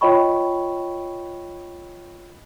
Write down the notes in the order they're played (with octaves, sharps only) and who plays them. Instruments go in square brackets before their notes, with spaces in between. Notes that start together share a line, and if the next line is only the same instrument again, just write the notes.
[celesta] F4 C#5 D#5 G5 B5 C#6